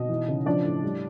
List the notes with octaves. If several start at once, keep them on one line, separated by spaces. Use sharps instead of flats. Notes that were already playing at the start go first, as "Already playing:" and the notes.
Already playing: B2 D#4 D#5
E3
C#3
F3 D4 D5
A2
G3